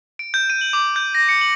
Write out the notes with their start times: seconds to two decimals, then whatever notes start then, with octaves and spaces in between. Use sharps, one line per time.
0.19 D7
0.34 G6
0.50 D#7
0.61 F#7
0.73 D6
0.96 G6
1.15 A#6
1.29 C#7
1.41 F#7